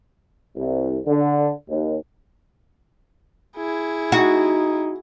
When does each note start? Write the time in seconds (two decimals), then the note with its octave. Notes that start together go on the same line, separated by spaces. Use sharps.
0.57 C2
1.07 D3
1.70 D#2
3.57 E4 G#4
4.12 D#4 F#4